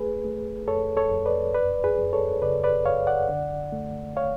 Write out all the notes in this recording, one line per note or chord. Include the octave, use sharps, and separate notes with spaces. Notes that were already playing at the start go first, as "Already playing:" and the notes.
Already playing: A3 G#4 B4
A3
F2 A4 C#5
A4 C#5
F2
B4 D5
F#2 B4 D5
G#4 B4
F#2
A4 C#5
C#3 B4 D5
B4 D5
F#2 C#5 F5
D5 F#5
D3
A3
C#5 F5